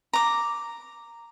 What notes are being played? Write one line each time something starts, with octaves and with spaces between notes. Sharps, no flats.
A#5 D6